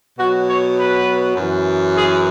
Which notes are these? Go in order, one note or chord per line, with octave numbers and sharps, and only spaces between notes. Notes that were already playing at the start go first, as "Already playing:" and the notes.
B2 F#3 F#4
C#5
B4
F#2 E3
G#4